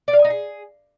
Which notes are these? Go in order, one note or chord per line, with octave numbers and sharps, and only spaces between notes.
D5
F5
G#5
D#4
G#4